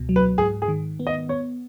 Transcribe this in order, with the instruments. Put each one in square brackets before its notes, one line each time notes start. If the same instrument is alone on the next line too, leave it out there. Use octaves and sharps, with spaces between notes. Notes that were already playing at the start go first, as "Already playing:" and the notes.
Already playing: [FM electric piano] C#2 B2
F#3
[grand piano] B4
[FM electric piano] G#2 [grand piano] G#4
[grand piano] G#4
[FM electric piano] D#3
B3
[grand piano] D#5
[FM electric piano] B3 [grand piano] C#5